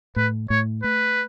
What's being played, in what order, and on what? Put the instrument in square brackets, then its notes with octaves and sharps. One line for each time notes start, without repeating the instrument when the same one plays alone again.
[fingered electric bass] A2 [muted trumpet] B4
[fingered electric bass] A2 [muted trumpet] C#5
[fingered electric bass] A3 [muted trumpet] B4